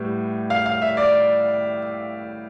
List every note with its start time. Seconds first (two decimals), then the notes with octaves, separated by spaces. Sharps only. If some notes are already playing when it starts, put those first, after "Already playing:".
Already playing: A2 G3 B3
0.50 F5
0.66 F5
0.82 E5
0.97 D5